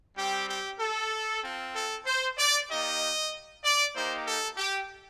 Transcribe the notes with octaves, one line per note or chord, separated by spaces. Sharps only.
G3 C4 G4
G4
A4
C4 F4
A4
C5
D5
A#3 D#4 G4 D#5
D5
A#3 D#4 G4 C5
A4
G4